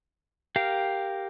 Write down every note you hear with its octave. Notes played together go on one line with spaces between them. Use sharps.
G4 A#4 F5